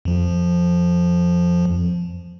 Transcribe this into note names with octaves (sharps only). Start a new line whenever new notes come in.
F2 F3